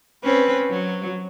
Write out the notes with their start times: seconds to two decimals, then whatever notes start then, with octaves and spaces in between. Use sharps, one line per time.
0.24 C4 C#4 B4
0.70 F#3